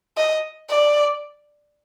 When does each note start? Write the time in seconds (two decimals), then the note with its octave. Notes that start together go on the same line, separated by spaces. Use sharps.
0.17 D#5
0.69 D5